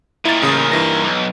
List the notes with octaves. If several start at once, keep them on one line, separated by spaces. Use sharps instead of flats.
A#2 D#3 E4 A6
A1 C#3 D#6
G2 E3 A#6
B1